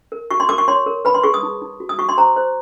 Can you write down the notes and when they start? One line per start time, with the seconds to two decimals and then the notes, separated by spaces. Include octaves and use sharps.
0.12 A#4
0.31 F#4 C#6
0.40 C6
0.49 A#4 D6
0.58 C#6
0.68 C#5 C6
0.86 A#4
1.05 B4 B5
1.14 C6
1.23 G#4 C#6
1.34 D#6
1.43 D#4
1.62 D#4
1.80 F#4
1.89 D#6
1.98 F#4 C#6
2.09 C6
2.17 C5 A#5
2.36 C5